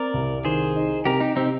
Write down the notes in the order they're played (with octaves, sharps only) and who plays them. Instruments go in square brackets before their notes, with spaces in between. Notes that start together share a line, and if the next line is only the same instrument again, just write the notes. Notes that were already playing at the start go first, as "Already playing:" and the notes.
Already playing: [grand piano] C4 [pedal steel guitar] A#4 D5
[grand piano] C2
[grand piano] D#3 [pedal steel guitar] G#4 C5
[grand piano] D#4
[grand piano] C3 [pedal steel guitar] G4 A#4
[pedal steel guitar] D#4 G4
[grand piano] C3 [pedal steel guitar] C4 D#4